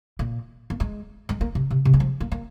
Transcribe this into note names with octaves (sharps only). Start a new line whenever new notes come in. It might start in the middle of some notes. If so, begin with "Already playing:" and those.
A#2
A#3
G#3
G#3
A#3
C3
C3
C3
G#3
F3
A#3
A#3